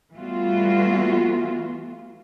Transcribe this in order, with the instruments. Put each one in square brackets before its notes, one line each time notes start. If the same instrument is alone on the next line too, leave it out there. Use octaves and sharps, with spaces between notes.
[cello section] E3 G3 A3 B3 F4 F#4